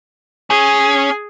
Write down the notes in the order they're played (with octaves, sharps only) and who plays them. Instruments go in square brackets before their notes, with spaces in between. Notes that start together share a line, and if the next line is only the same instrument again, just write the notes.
[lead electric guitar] C#4 [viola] G#4